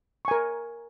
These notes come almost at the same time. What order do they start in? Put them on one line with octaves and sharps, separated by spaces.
C#6 G#5 A#4